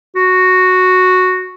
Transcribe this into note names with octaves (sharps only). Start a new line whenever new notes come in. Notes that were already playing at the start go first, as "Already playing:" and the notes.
F#4